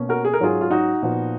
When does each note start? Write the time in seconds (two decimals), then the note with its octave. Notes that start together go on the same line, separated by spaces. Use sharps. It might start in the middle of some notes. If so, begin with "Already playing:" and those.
Already playing: B2 A#3 C#4
0.09 F#4 A#4
0.25 G#4
0.33 A#4
0.40 G#2 F#3 C#4 F4 G#4
0.61 F4
0.71 D#4 F#4
1.02 A#2 F3 B3